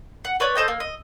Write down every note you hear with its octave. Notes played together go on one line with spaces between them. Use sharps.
F#5
B4 C#5 D5
A4 C5 D#5 G5
A#3
D#5